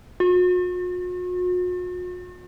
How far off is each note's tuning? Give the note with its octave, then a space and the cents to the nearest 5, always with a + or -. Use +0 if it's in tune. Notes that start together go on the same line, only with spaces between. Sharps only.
F#4 -45